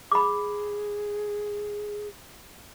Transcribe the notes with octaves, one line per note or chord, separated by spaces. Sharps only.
G#4 B5 D6